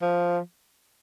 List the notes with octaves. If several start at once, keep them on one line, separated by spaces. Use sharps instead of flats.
F3